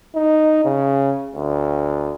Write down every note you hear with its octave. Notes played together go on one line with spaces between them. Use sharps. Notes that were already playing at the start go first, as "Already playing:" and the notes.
D#4
C#3
D2